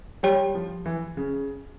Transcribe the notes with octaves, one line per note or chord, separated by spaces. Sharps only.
G3 G4 C#5 G5
F3
E3
C#3